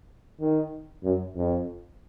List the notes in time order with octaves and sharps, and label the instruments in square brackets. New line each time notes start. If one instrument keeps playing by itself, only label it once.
[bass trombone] D#3
F#2
F2